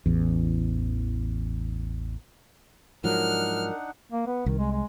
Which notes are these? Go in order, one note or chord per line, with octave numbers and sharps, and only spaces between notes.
A1 E2
G#2 F3 F#3 D4 D#4 A#4 F#5 F6
A#3
B3
C2 D#3
G#3
G#3